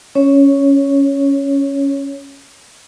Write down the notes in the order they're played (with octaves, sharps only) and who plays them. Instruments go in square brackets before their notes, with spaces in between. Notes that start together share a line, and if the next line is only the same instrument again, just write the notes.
[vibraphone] C#4 C#5